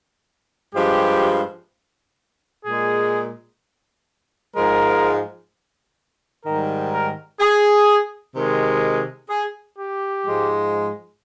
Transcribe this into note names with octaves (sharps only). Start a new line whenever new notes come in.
G2 F3 G#3 G4
A#2 G#3 G#4
G#2 F3 G#3 A#4
G#2 D#3 G3 A#4
A#4
G#4
C3 D#3 G#3
G#4
G4
G#2 F3 G#3